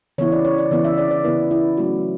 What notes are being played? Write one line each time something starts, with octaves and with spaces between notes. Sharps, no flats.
C#3 E3 B3 E4 C#5
D5
C#5
D5
C#3 E3 B3 E4 D5
E5
D5
D5
C#3 E3 B3 E4 B4
E4
F#3 A3 C#4 E4 F#4